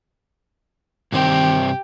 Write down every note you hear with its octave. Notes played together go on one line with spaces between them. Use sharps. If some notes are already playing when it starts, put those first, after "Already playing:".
G2 C3 D#3 C4 G4